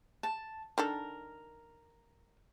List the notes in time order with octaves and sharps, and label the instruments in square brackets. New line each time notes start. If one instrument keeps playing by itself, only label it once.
[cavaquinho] A5
[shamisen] D#3 D4 A4 [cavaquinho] A#4